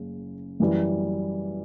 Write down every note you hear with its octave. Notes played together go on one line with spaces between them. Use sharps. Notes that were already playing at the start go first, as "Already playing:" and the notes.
Already playing: F#1 C#3
F#2 E3 G3